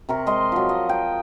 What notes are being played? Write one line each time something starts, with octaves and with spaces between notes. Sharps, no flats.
C3 A#4 C#6
G#3 D#5 C6
F3 F#3
D#5
G5